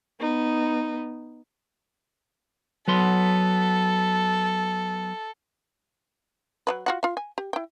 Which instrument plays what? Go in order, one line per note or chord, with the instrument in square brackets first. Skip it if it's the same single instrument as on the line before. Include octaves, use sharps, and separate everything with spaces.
[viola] B3 D#4
[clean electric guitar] F#3 B3 C6 [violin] A4
[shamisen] F#3 G#3 B4
F4 F#4 F#5
F4 F5
G#5
G4
E4 G5